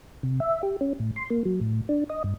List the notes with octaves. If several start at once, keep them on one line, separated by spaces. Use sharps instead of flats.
C3
E5
G4
C#4
A2
C6
A#3
F#3
A2
D4
D#5
G2